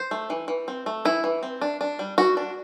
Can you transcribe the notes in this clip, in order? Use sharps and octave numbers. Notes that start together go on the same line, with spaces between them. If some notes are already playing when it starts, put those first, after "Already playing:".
Already playing: C5
A3
E3
E3
C4
A3
E3 E4
E3
C4
D4
D4
G3
G3 F#4
D4